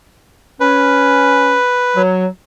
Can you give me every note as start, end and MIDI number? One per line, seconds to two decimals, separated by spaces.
0.60 1.56 61
0.60 2.02 71
1.96 2.25 54